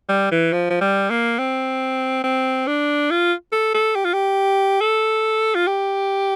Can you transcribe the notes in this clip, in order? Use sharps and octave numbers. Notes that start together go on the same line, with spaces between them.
G3
E3
F3
F3
G3
A#3
C4
C4
D4
F4
A4
A4
G4
F4
G4
A4
F4
G4